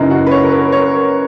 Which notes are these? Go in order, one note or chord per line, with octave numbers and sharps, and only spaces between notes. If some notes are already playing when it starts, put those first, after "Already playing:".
Already playing: F#2 C#3 E3 D#4
F#4
B4
C#5
A#4
B4
C#5